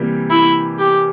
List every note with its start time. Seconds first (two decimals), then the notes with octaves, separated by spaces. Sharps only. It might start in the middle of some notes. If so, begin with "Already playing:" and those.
Already playing: C3 E3 G3 A#3
0.31 E4
0.79 G4